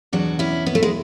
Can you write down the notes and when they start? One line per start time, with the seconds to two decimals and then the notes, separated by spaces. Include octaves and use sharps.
0.13 E2 B2 F#3 D4 F#4
0.39 C#4 E4
0.66 B3
0.75 A3
0.83 G#3